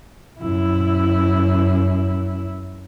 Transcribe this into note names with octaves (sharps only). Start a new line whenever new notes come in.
F#2 E4